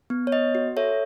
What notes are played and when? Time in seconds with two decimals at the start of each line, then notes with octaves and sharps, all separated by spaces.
0.10 B3
0.27 C#5
0.32 B3 D#5
0.55 F#4
0.77 A4 C#5 E5